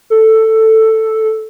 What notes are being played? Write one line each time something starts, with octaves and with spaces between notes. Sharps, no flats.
A4